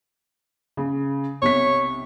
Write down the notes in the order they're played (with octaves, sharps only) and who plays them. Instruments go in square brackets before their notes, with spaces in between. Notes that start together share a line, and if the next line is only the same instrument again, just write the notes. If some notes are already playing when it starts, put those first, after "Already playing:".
[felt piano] C#3
[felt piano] B1 C3 B6 [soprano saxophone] C#5